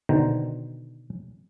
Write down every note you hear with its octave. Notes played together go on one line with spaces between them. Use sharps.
B2 D3 D#3 C5 G5 A#5